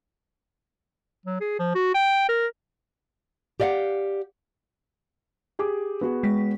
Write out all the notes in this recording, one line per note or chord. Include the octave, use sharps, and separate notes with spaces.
F#3
G#4
F3
F#4
G5
A#4
G4 D5 D#5 F5 F#5
G4 G#4 D6
B3 F#4 G#4
G#3 B6